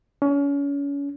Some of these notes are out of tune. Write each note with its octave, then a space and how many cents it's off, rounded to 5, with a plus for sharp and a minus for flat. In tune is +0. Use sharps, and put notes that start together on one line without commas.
C#4 +30